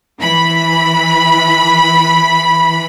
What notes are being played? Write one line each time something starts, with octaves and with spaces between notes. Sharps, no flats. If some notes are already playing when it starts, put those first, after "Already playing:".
E3 B5